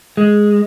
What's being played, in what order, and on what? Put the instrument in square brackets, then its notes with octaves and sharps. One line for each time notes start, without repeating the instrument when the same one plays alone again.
[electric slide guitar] G#3